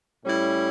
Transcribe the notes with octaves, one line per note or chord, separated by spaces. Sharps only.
A2 G3 C#4 E4